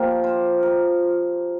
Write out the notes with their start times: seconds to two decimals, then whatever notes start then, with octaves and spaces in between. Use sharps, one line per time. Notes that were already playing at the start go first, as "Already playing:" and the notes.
Already playing: A#2 F3 G4 A#4
0.24 C5
0.63 A#4